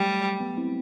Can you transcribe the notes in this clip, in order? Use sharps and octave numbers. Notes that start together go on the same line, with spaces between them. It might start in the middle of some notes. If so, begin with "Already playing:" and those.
Already playing: F#3 G3 A3
G3 B3
C4 E4